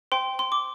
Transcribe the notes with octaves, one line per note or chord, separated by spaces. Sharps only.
C5 G5 C6
C6
D6